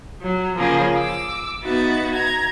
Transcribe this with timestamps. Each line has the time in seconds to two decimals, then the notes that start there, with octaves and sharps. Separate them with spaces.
0.22 F#3
0.57 C#3 F3 A#3 G#4
0.96 D6 E6
1.63 B3 D#4 F#4 E5 A6
2.14 A#5 G#6